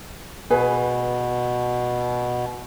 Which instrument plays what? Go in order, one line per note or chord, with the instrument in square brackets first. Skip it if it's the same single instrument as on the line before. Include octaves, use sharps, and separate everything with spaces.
[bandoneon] B2 [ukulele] G#4 B4 G#5